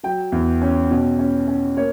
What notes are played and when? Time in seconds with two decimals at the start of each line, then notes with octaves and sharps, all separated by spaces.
0.03 F#3 G5
0.32 E2
0.61 C#4
0.91 B2
1.19 C#4
1.48 C#4
1.77 A#3 C#5